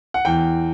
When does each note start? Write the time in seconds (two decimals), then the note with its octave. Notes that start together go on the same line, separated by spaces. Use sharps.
0.14 F#5
0.25 E2 G5